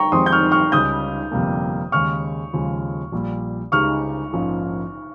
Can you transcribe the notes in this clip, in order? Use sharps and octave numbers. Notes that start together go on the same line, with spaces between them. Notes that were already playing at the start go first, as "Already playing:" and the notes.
Already playing: G5 A#5 C#6
F2 D#3 G#3 C4 G4 C6 D#6
G6
C#6 F6
C#6 F6
C#2 C#3 G3 D#6 G6
G1 F2 C3 G3 A#3
D#2 C#3 G#3 C#6 F6
D#2 C#3 F3 G#3
A#1 A#2 G3
C#2 C#3 G#3 D#4 G4 C#6 F6
A#1 G#2 F3 A#3 C#4